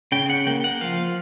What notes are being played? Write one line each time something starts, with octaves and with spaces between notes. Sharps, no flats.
C#3 G5
F#5
A#3 G5
F#5
F3 F5